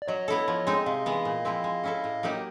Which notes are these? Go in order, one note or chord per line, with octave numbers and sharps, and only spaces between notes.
D5
F#3 C#5 D#5
B3 E4 A4
F3
G#3 C4 D#4
C3 D#5 F5
E3 G#3 B3
A#2
F3 G#3 C4 E4
G#3
C#4 E4 A4
A2
F#3 A#3 D#4 G4